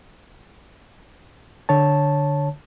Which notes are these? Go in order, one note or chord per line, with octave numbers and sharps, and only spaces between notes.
D3 C#5 A5